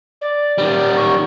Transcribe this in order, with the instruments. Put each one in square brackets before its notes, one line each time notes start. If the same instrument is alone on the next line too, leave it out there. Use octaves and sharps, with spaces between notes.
[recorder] D5
[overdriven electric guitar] D#3 G3
[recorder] C#6